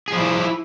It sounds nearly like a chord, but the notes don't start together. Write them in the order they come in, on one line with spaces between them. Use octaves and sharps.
G#4 F3 E4